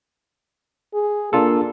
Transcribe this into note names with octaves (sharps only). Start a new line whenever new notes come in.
G#4
A#3 D4 F4 A4